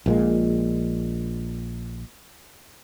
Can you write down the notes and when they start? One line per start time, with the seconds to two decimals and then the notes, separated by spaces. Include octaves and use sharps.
0.06 A#1 A#2 G#3